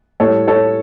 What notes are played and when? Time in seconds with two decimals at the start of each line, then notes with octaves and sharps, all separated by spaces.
0.20 A2 G3 A4 C#5
0.48 A4 C#5